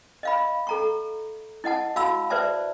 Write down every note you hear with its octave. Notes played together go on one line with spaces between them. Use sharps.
D#5 F5 B5
A4 A#5 C#6
E4 D#5 F#5 A5
F#4 F5 A5 B5 E6
B4 C5 D5 E5 A5